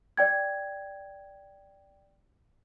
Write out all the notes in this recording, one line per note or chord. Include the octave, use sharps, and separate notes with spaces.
D5 G5 G#6